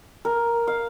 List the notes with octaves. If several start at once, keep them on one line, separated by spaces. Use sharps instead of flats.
A#4
F5